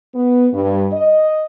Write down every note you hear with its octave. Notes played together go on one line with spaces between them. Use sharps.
B3
G2
D#5